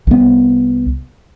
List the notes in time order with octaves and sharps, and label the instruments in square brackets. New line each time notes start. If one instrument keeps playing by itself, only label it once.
[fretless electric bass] C2 B3